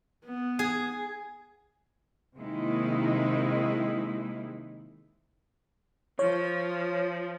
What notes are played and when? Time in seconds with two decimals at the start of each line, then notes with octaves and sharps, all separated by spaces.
0.25 B3
0.59 G#4
2.37 C3 D#3 G#3 A#3 D#4 E4
6.19 F3 C#5